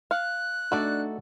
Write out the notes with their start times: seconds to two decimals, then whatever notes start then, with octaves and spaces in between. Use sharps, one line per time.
0.11 F5 F#6
0.72 A3 D4 D#4 F#4 A4 D5